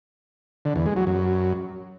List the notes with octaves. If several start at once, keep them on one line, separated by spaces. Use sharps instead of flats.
D3
E2
G#3
F#3
F#2